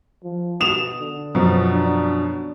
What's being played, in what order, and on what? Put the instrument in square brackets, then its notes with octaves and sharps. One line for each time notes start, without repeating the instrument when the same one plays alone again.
[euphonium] F3
[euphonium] B2 [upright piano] D#6 E7 F7
[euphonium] D3
[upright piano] F#2 B2 F3
[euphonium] D4